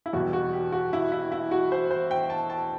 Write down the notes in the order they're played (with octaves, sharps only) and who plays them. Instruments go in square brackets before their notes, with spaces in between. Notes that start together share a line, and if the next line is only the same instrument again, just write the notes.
[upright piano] E4
E2 B2 G3 F#4
F#4
G4
F#4
E4
E4
E4
F#4
C5
C5
G5
A5
A5